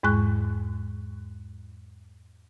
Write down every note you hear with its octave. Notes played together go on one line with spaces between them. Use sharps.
E2 G#2 G#3 C#6 F#6